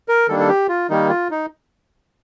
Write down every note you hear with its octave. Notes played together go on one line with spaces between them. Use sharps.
A#4
D#3 G3 A#3 D4 A4
A4
G4
F4
D#3 G3 A#3 D#4
F4
D#4